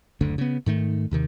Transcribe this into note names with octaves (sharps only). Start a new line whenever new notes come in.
F#1 D2 D3
C#3 B3
G#2 D#3 A3
D#2 C3 D#3